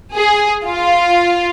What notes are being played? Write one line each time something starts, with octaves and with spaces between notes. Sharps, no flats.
G#4
F4